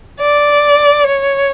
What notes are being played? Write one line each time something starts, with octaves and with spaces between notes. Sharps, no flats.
D5
C#5